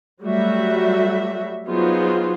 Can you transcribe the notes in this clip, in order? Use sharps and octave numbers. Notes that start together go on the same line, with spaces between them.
F#3 G3 A3 F#4 E5
F#3 B3 D#4 F4 G#4 C5